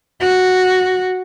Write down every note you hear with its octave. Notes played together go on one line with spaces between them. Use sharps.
F#4